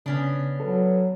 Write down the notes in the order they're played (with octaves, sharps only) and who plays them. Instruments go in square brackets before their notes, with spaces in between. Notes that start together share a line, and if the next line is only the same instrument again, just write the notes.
[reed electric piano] C#3 [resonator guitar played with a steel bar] B3 C#4 D4
[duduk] F#3 [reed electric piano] A4 B4